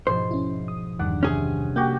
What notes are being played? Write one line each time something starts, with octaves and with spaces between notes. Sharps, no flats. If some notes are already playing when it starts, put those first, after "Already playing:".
G#2 B2 F3 C5
C#4 E4
D#6
E2 G2 D#3 G3 D4 F#5
C3 C#4 G#4 G#5 D#6
A#3 F#4 G4 G5